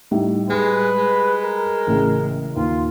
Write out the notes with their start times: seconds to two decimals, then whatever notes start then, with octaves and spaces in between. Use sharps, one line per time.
0.11 A2 G3 D#4
0.50 G3 G#3 B4
0.98 G#3
1.45 A#4
1.87 A1 A2 C#3
2.56 D#2 F4